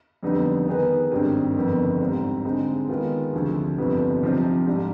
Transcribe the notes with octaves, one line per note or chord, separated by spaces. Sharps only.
F2 D3 G3 B3 D#4
D#3 B3 D#4 G#4 B4
G#1 G2 D#3 G3 C4
G1 F2 D#3 B3
G#2 G3 C4
D3 G#3 C4 D#4
D#3 G#3 B3 F4
D2 C3 F3
G1 F2 C3 F3 B3
C3 F3 C4 D#4 G4
G#2 G3 D4